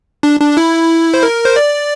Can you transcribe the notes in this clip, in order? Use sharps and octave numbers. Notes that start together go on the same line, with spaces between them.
D4
D4
E4
C5
A#4
C5
D5